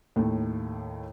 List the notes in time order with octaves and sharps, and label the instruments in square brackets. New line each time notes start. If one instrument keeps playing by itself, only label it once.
[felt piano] D#2 A2 A3